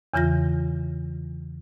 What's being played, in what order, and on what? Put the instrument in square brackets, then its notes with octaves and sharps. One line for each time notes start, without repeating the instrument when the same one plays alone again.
[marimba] E2 C#3 E3 F4 A#6